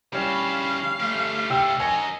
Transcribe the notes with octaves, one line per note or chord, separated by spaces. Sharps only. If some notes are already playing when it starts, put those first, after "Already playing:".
C#3 G3 C#4 E4 F5
A3 G4
C3 A3 G4 G5 E6
A#4 C#5 D#5 G#5